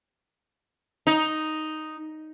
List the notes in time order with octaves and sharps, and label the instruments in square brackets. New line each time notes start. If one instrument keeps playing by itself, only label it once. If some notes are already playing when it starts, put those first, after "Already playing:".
[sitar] D#4